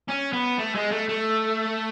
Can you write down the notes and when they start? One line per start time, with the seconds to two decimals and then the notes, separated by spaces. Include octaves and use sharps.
0.08 C#4
0.33 B3
0.58 A3
0.75 G#3
0.92 A3
1.09 A3